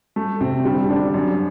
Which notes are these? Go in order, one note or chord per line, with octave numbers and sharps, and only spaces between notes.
A3
C3 C4
D3 G3
D3 D4
F#2